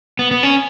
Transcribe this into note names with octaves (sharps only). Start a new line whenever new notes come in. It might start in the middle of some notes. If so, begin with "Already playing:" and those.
B3
B3
C#4